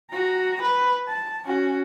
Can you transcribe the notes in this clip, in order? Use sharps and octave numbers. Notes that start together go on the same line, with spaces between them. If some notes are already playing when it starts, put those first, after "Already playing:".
F#4 A#5
B4
A5
C#4 F#4